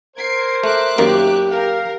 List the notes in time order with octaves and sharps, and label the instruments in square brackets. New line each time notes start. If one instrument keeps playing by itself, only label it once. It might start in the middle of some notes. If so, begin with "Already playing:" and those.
[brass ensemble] A#4 C5 [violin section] G#6 C7 D7
[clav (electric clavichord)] A3 [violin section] E5 D6 F#6
[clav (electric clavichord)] F#2 D#3 A#3 [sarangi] G4
[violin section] A#4 [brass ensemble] F5